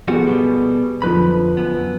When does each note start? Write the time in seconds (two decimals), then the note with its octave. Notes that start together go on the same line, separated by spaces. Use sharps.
0.08 F3 G3 B3 F#4 G#4 A4
0.27 B2 G3
1.02 F2 D3 F3 B4 B5
1.57 F#2 B3